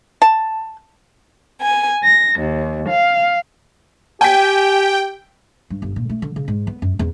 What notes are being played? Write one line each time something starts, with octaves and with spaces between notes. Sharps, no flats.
A5
G#5
A#6
D#2
F5
G4 G5 G#5 B6
G2
G1
A#2
A3
D3
C#3
G#2
B3
F#2
E2